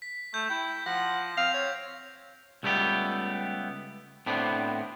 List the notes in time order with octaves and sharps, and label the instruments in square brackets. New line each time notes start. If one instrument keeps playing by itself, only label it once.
[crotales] B6
[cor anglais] A3 [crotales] G6
[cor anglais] E4 [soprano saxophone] G5
[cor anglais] F3 [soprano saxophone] F#5 [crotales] A#6
[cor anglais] C4 [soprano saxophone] F5 [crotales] F7
[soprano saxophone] C#5
[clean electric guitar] C#2 G3 A3 B3 G4
A2 B3 C4 D4